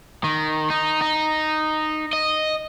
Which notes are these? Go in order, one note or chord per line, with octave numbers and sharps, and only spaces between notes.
D#3
D#4
D#4
D#5